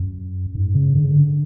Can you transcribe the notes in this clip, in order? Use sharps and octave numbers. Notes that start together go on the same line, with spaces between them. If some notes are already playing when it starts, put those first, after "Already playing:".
Already playing: F#2
G#2
C#3
D3
C#3
D3